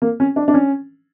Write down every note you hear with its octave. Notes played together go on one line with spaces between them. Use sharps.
A#3
C#4
D4
D4
C#4